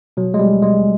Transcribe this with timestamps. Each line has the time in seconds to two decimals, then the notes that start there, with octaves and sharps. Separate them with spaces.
0.17 B2 F#3
0.34 G#3
0.40 B2 G3
0.62 B2 G#3